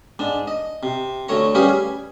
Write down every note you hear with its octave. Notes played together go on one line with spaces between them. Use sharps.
G#2 D4
D#5
C3
D2 A3 C#5 A#5
G3 C#4 G4 G#4 B4 F5
G#5